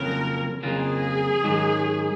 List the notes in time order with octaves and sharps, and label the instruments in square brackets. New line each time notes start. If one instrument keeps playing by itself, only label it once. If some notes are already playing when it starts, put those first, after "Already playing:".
Already playing: [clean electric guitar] F2 C#3 F#3 A#3 F4 [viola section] A#4
[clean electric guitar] F2 C#3 F#3 A#3 F4 [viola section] G#4
[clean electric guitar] G#2 D#3 F#3 C#4